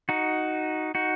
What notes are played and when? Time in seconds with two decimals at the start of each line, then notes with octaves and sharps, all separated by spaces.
0.09 D#4 F#4
0.95 D#4 F#4